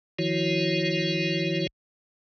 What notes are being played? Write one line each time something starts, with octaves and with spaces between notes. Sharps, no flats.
D#3 F3 E4 F#4 C#5